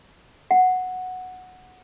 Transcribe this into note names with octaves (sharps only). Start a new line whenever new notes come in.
F#5